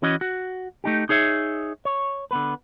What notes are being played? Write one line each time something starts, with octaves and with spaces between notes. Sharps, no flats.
E3 C#4 F#4 D#5
F#4
A3 D#4 G4
D#4 G#4 C#5 E5
C#5
D3 B3 B4